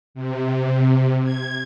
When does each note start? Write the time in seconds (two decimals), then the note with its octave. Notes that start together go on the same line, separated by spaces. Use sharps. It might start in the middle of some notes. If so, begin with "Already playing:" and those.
0.14 C3
1.24 G#6